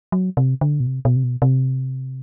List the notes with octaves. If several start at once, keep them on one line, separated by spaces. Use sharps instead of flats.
F#3
C3
D3
B2
C3
B2
C3
B2
C3